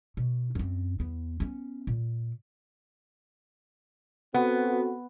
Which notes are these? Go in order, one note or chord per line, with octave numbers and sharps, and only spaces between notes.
B2
F#2 C4
E2 B3
B3 C#4
A#2
B3 C4 F#4 A4